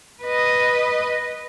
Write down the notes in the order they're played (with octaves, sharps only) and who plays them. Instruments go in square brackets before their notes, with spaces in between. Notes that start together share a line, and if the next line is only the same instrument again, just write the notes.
[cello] B4 D#5